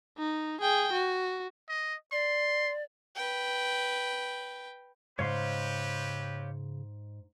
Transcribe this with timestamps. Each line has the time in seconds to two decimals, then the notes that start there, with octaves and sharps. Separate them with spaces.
0.18 D#4
0.61 G#4 G5
0.93 F#4
1.69 D#5
2.12 D5 C6
3.16 B4 G5
5.19 G#2 C#3 C4 G4 B4 C#5 F5 C6